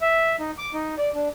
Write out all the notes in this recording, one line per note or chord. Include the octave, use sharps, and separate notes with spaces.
E5
D#4
D6
D#4
D5
D4